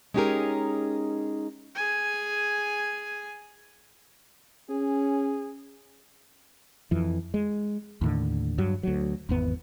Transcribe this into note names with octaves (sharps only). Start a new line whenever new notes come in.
G#3 C#4 D#4 G4 G#4 A#4
G#4 G#5
C#4 G#4
F2 E3
G#3
D#2 A2 D3
G2 F#3
D2 F#3
G#1 E2 B3